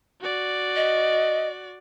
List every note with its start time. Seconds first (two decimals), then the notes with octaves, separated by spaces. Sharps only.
0.21 F#4 D5
0.76 D#5